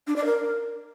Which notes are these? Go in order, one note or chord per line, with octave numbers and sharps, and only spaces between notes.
D4
D5
A#4